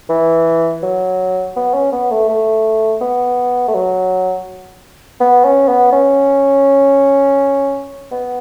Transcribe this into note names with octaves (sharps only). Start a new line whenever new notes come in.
E3
F#3
B3
C#4
B3
A3
A3
B3
A3
F#3
B3
C#4
B3
C#4
B3